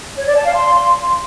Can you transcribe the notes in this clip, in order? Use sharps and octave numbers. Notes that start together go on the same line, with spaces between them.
C#5
D5
A5
F5
C6